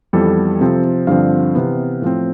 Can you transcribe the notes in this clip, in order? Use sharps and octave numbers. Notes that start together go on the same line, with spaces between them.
F2 E3 G3 B3 A4
C3 F3 C4
G2 D3 F3 C4 F5
C3 E3 B3
A2 F3 C4